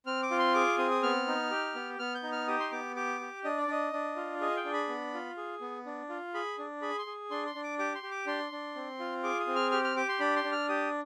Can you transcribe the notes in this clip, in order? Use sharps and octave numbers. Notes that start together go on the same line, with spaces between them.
C4 F6
D6
F4
C6
G#4 D6
C4 D#6
D#6
B3 F6
D#4
G4
B3
B3 F6
G6
D#4
F6
G4 D#6
C6
B3 D6
G4 D6
G4
D4 D#5
D5
D4 D#5
D4
F4
G#4 D#5
G5
D4
B5
B3
F4
G#4
B3
D4
F4
G#4 B5
D4
G#4 B5
C6
G#4
D4 C6
C6
D4
D6
G4 D6
C6
G4
D6
D4 C6
D4
C4
F4
G#4 D6
D#6
C4
F6
G4 F6
F6
G4 D6
C6
D4 B5
C6
D4
F6
G4 D#6